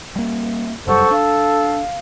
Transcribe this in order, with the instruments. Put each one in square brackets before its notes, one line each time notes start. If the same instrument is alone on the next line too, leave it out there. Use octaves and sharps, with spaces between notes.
[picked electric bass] G3 A#3
[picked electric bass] F1 F#2 G3 [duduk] A4 [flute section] C5 F#5 C#6
[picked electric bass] D4 [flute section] F5